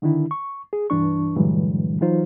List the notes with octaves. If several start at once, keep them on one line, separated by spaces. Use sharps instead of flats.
D3 D#3 D4 E4
C#6
G#4
C2 G2 E3 D4 C#6
G2 A#2 D3 E3 F#3 G#3
E3 F#3 D#4 F4 C5